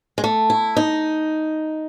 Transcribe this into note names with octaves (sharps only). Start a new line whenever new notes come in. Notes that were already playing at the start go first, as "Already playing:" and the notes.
G#3
A3
E4
D#4